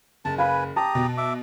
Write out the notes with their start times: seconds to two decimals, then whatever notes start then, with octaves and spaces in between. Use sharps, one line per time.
0.25 F#1 A5
0.38 B4 F5 G#5 B5
0.76 G4 A5 A#5 D#6
0.95 B2
1.17 E5 D6